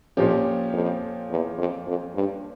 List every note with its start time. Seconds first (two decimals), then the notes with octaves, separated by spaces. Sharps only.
0.16 F2 A#2 F3 C#4 G4
0.73 F2
1.30 E2
1.58 F2
1.87 F2
2.15 G2